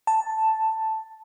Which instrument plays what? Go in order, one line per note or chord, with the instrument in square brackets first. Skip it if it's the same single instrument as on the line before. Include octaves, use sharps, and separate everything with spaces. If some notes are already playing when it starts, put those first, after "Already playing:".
[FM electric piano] A5